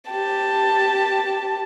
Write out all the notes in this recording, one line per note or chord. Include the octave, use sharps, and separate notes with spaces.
G4 A5